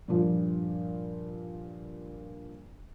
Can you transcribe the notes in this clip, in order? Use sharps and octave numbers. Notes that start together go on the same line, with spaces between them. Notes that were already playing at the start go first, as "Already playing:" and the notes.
G2 A#2 F3